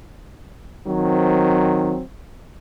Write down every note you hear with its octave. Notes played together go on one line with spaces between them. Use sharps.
D#3 F#3 C4